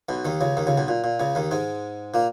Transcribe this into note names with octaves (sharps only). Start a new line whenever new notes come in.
B1 B2
D#2 D#3
C#2 C#3
D#2 D#3
C#2 C#3
B1 B2
A#2
A#2
C#2 C#3
D#2 D#3
G#2 G#3
A#2 A#3